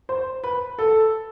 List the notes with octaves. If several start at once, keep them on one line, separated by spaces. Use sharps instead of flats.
C5
B4
A4